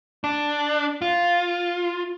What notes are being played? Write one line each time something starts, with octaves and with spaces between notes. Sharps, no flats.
D4
F4